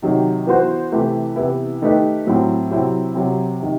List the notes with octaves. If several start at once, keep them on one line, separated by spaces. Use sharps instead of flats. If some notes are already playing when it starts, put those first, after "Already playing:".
C3 D#3 F#3
E3 B3 F#4 C5
C3 E3 A3 E4 G4
C3 E3 B3 E4
D#3 A3 D#4 G4 B4
A2 F#3 C4 E4
C3 F#3 C4 E4
C3 F#3 C4
C3 D#3